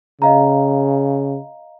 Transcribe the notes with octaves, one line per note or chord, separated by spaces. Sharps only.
C#3 D#5 F5 A#5